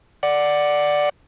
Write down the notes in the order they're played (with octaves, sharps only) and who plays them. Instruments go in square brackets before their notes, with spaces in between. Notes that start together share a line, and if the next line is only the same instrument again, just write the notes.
[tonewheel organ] D5 F#5